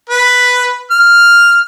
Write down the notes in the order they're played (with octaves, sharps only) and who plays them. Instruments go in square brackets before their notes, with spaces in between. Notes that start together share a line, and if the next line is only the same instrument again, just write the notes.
[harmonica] B4
F6